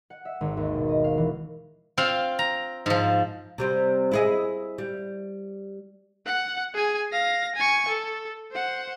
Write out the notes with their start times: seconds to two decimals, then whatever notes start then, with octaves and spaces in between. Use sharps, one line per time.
0.10 F#5
0.25 E5
0.41 G#1
0.57 D#2
0.74 B2
0.89 D#5
1.04 F5
1.18 E3
1.98 C4 F4 F5
2.39 A#5
2.86 G#2 F3
3.58 C3 G3 C4
4.11 E4 G#4 D#5
4.78 G3
6.26 F#5 F#6
6.74 G#4 G#5
7.12 F5 A#6
7.56 G#5 C#6
7.89 A4
8.52 C5 F#5